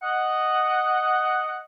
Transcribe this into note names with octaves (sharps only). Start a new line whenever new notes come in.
D#5 F#5